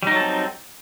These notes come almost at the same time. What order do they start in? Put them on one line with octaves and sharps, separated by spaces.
G3 D#4 F#3 A4 C4